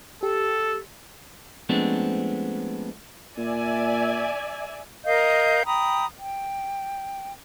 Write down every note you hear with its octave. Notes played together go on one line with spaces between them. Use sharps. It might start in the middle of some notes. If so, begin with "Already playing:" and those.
G4 A4
F3 G#3 A3 B3 C4 D4
A#2 D5 E5 G#5
A#4 D#5 F5 G6
G5 A#5 B5 D#6
G5